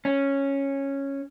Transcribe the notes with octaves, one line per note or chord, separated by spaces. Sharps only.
C#4